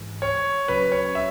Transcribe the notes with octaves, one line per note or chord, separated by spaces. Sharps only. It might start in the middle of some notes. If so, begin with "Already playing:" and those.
Already playing: G#2 E3 G#3
C#5
C#3 F#3 C#4 B4
C#5
E5